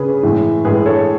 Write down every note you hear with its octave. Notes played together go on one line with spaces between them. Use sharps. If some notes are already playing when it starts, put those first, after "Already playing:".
Already playing: C#3 G#4 B4
A2 E3 G#3
A2 E3 G#3 G#4 B4
A4 C#5